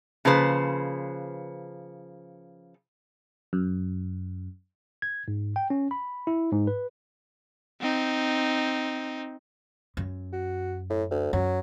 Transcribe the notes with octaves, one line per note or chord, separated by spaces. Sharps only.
C#3 F3 A#3 B4 C5
F#2
G#6
G#2
G5
C#4
B5
E4
G#2
B4
C4 D#4
F#2
F#4
A2
D2
F#2 F#3